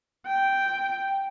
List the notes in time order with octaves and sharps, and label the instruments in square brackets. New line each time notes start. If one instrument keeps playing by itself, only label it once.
[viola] G5